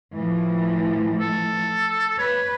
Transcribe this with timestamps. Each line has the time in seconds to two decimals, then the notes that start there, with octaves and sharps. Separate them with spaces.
0.15 A2 E3 F3
1.20 A4
2.19 B4 C#5